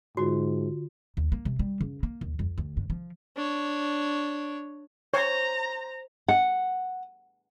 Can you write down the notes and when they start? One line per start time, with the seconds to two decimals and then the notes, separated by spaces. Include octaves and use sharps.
0.17 G#2 D3 F4 F#4
1.17 D#2
1.32 A#3
1.45 C3
1.59 G3
1.81 C#3
2.03 A#3
2.21 D#2
2.39 F2
2.58 D2
2.77 G2
2.90 F3
3.36 D4 C#5
5.14 C5 C#5 A#5
6.28 F#5